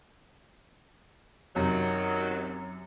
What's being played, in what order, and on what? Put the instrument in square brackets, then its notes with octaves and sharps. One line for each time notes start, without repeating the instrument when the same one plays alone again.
[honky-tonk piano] F#2 C3 [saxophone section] D#3 F#3